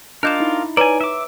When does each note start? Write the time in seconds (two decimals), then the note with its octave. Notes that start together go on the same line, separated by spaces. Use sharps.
0.23 D4 F4 A#4 D#5 D6 F#6 G6 E7
0.40 D#4 E4
0.77 B4 C#5 D5 G#5 A#5
1.01 E5 D6